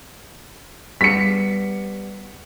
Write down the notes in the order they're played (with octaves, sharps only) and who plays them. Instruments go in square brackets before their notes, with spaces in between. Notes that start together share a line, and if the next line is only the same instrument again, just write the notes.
[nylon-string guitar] G3 B3 [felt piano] B6 C#7